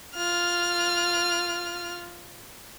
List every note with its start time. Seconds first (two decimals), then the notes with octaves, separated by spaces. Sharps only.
0.15 F4 F6